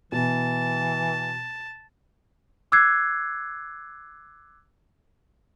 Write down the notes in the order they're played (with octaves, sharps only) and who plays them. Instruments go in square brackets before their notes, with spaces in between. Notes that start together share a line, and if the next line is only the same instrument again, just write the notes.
[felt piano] B2 [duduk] E3 [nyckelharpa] A5
[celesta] D6 E6 F#6 G#6 C7